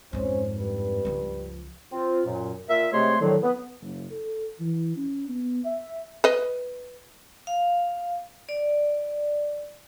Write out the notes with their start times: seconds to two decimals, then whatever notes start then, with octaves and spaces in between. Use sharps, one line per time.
0.13 F2 G#2 C#4 C5
0.56 G2 B4
1.05 C#2 F3
1.93 C4 F4
2.26 F#2 A#2
2.70 A#2 A#4 E5
2.92 C3 G#3 A3 C#5 C6
3.21 A2 D3 D#3 F3 F#3
3.42 B3
3.81 F#1
4.11 A4
4.60 E3
4.96 C#4
5.29 B3
5.64 E5
6.24 B4 D#5
7.47 F5
8.49 D5